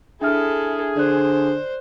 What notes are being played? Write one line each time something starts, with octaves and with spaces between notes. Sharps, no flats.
D4 E4 G#4 A4 E5 F6
D3 C5 D5 F#6